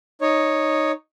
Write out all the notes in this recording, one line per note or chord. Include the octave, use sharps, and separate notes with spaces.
D#4 C#5